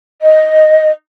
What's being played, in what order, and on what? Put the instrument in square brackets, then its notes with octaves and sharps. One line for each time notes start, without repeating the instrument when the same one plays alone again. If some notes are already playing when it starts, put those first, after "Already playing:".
[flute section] D#5